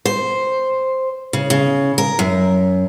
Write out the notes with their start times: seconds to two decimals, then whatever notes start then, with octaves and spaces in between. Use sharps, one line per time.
0.06 C5
1.33 C#3
1.50 C#3
1.98 A#4
2.19 F#2